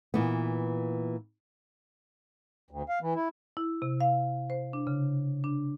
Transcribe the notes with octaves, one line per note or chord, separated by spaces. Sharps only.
A#2 E3 B3
D2
F5
E3
E4
E4
C3
F5
C5
D4
C#3
D4